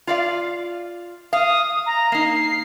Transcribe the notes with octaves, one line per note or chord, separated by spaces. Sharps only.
F4 D5 F5
F5 D#6
A#5
A#3 D#4 C7